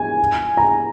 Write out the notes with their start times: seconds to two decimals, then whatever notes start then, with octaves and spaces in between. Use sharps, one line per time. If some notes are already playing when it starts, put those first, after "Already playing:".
Already playing: G#5
0.57 A#5